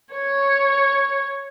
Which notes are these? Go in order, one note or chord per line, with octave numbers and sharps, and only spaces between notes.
C#5